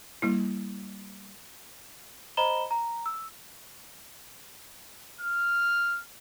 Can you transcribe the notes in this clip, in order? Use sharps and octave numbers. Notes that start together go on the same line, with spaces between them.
G3 A#3 E4
C5 D#5 A#5 B5 E7 G7
A#5
E6
F6